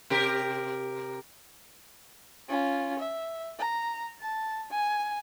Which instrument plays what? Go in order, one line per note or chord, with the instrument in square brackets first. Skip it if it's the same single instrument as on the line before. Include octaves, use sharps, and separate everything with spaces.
[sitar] C3 G4 A#4
[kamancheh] C#4 F4
E5
A#5
A5
G#5